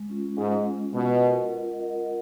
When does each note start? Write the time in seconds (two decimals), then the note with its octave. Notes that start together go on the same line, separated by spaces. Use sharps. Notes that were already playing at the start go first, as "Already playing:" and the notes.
Already playing: G#3
0.10 C#4 F4
0.38 G#2 G#3
0.67 C#4 F4
0.94 B2 F4
1.23 A#4 D#5 F#5
1.52 F4
1.80 A#4 D#5 F#5